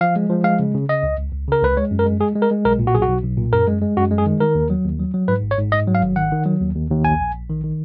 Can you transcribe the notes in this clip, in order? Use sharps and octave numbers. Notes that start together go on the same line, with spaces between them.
F3 F5
G#3
F3
G#3 F5
C#3
C#3
C#3 D#5
C#2
C#2
C#2
C#3 A#4
C#2 B4
G#3 C#5
F#2
A#4
G#3
G#3 G#4
G#3
A#4
G#3
B1 A#4
A#2
F#4
B1 G#4
F#4
B1
B1
A#2
F#2 A#4
G#3
G#3
F#2 F#4
G#3
G#4
D#3
D#3 A#4
D#2
F#3
D#2
F#3
F#3
G#2 B4
G#1
C#5
G#2
G#2 D#5
F#3
F5
G#1
D#3 F#5
D#3
F#3
D#2
D#2
D#2
A#1 G#5
A#1
A#1
D#3
D#3